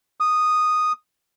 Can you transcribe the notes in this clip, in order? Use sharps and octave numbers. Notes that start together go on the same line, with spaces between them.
D#6